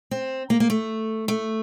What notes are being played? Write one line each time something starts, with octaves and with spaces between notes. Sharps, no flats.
C4
A#3
A#3
A3
A3